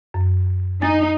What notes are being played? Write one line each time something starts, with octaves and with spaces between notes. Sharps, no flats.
F#2
D#4 G#5 A6